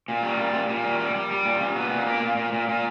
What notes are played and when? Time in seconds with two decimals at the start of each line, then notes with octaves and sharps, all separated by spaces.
0.08 A#2
0.23 G3
0.39 A#2
0.54 A#2
0.69 A#2
0.85 G3
0.99 G3
1.15 G3
1.31 G3
1.45 A#2
1.61 A#2
1.76 B3
1.91 A#2
2.06 A#3
2.23 A#2
2.37 A#2
2.53 A#2
2.69 A#2